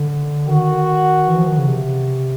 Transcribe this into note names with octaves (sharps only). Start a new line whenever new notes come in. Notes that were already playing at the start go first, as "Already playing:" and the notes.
Already playing: D3
D#3 F#4
E3
F3
D#3
C#3
C3